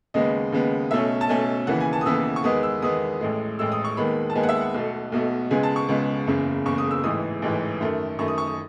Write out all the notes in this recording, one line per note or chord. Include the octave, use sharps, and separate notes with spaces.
D#2 C#3 G#3 B3 D#5
D#2 C#3 G#3 B3
B1 B2 A3 C#4 E5
A5
B1 B2 A3 C#4 G#5
D#2 C#3 E3 B3 F#5
G#5
A5
D#6
D#2 C#3 E3 B3 E6
C#6
E2 D#3 G#3 B3 D#6
E6
E2 D#3 G#3 B3 D#6
A1 A2 G#3
A1 A2 G#3 E6
D#6
C#6
D#2 D#3 G#3 B3 B5
A5
D#2 D#3 G#3 B3 G#5
F#5
E5
F#5
B1 B2 A3
B1 B2 A3
C#2 C#3 G#3 B3 G#5
A5
C#6
C#2 C#3 G#3 B3
F#1 E2 C#3
F#1 E2 C#3 C#6
D#6
E6
A1 G#2 E3 D#6
A1 G#2 E3
F#2 D#3 A3
F#2 D#3 A3 C#6
D#6
C#6
D#6